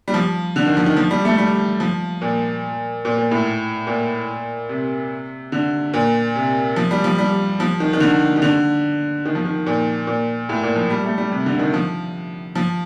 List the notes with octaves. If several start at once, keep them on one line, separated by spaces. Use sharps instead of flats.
G3
F3
D3
D#3
F3
D#3
F3
G3
A3
G3
F3
A#2
A#2
A#2
A2
A#2
C3
D3
A#2
C3
F3
G3
F3
G3
F3
D#3
D#3
D3
D#3
D3
D#3
F3
D#3
A#2
A#2
A2
A#2
F3
G3
A3
G3
C3
D3
D#3
F3
F3